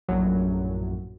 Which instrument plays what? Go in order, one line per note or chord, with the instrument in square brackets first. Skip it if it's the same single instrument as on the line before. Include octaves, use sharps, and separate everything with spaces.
[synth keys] A#1 F#2 A2 F#3